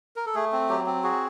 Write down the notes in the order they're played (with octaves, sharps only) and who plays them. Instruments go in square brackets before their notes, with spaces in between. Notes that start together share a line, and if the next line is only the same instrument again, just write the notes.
[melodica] A#4
A4
A3 G#4
C4
F#3 G4
C4
F#4 G#4